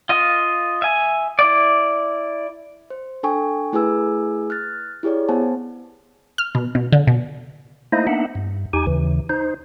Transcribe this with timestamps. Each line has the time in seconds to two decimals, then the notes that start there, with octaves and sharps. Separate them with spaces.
0.09 F4 D#5
0.82 E5 G#5
1.39 E4 D5
2.90 C5
3.23 D4 A4 G5 G#5 C#6
3.73 A3 E4 G#4 B4 G#5 E6
4.50 F6 F#6 A6
5.03 E4 G4 G#4 C#5 D5
5.29 B3 C5 F#5 G#5 A5
6.38 F6
6.55 B2
6.75 B2
6.92 D3
7.07 B2
7.92 A3 A#3 D#4 E4 C5 D#5
8.07 A#3 B3 D4 D#4 E5 F#5
8.35 G2
8.73 E2 D#4 G4 G#5
8.87 D#2 C#3 E3
9.29 D#4 C5